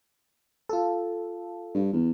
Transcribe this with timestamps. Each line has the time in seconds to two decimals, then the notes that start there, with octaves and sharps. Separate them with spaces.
0.69 F4 A4
1.74 G2
1.93 E2